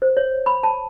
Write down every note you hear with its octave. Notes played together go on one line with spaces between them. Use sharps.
C5
C#5
B5
A5